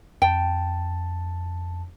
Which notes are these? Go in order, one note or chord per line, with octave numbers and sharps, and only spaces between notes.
F2 G5 A5